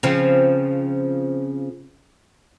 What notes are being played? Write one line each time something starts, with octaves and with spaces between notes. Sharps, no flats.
C#3 F3 C4